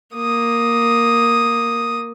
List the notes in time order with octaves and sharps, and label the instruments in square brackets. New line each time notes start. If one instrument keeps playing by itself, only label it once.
[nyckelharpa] A#3 D#6